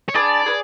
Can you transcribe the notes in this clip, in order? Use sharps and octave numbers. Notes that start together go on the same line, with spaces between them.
C#5
D4 G#4 B4 D5
G#4 B4